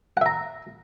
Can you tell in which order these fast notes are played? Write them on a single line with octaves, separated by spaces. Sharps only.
F#5 E5 A#5